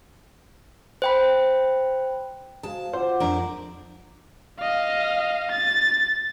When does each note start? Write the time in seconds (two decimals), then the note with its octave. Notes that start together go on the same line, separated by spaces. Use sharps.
1.02 C5 G5 B5
2.63 G#3 F#4 C5 F5 A5
2.93 F4 C5 F#5 D6
3.20 F2 D4 A#4
4.59 D#5 F5
5.52 A6